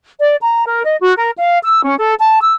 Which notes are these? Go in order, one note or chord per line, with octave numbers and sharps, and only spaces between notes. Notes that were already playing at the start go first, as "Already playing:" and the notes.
D5
A#5
A#4
D#5
F#4
A#4
F5
E6
C#4
A4
A5
E6